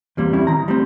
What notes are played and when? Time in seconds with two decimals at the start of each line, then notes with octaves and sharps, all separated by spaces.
0.17 E2 G3 A#3 C4
0.33 G3 C4 C#4 E4
0.47 D#3 A#5
0.68 G3 A3 C4